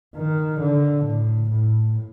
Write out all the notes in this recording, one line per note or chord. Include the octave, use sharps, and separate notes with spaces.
D#3
D3
A2
A2